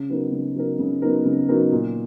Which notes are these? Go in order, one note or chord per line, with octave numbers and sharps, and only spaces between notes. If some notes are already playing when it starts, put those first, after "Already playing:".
Already playing: C#3
F#3 B3 D#4 A#4
C#3
F#3 B3 D#4 A#4
C#3
F#3 B3 D#4 A#4
C#3
F#3 B3 D#4 A#4
A#2